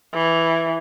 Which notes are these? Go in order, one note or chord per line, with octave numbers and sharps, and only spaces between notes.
E3